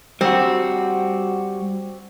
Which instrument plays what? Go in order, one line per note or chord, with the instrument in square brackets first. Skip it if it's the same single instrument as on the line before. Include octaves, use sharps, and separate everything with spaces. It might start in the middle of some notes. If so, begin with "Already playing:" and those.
[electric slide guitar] G3 F#4 [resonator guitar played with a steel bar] C4